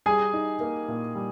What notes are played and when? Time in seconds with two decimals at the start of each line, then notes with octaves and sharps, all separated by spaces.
0.06 G3 G#4 G#5
0.33 D#4
0.60 A#3
0.88 A#2
1.15 G3